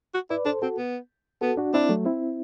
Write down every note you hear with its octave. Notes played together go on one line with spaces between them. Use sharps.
F#4
E4 B4 D5
D4 A4 C5
C4 F#4 A4
B3
B3 F#4 A4
D4 F#4
C4 D4 E4
F#3 A3
C4 E4